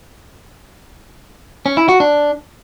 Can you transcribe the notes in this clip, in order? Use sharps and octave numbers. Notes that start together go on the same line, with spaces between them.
C#4
E4
F#4
D4